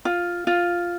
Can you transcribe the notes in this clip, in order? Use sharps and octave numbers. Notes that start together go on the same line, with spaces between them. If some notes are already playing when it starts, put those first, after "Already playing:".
F4
F4